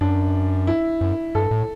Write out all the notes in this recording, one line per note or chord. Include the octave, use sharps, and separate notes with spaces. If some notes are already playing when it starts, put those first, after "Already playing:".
F#2 D4
E4
F#2
G2 A4
A2